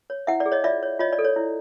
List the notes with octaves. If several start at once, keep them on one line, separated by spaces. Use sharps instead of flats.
C#5
E4 E5 F#5
D5
G#4
C#5 D#5
F4 D5 E5
C#5
F4 C#5 D#5
D5
A4
C#5
E4